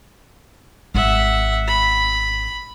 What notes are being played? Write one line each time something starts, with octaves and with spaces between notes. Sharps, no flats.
G#1 E5 F#5
B5